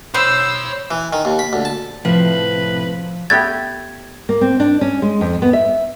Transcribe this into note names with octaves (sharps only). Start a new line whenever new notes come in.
C5 C#5 B5 E6
E3
D#3
D#2
B5
D2
A5
A2 C3 F3 B4
A3 B3 G4 G#6 A6
A#3
C4
D4
C#4
G#3
F2
B3
E5